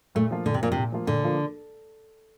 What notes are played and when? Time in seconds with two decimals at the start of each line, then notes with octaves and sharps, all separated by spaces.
0.15 A#2 A3
0.31 F3 A#3 F4
0.46 A#2 D3
0.54 C3
0.62 A#2 F3 A#3 F4
0.72 C3
0.77 A#2
0.92 F3 A#3 F4
1.07 A#2 D3
1.23 F3 A#3 F4